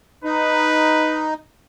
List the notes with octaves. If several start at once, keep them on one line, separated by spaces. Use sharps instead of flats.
D#4 B4